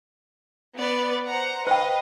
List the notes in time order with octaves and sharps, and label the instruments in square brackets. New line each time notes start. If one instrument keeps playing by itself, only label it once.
[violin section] B3 B4 D5
C5 F#5 A#5
[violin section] B4 D#5 F5 [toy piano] C5 G5